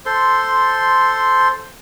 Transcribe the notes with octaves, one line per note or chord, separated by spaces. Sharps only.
A4 C5 C6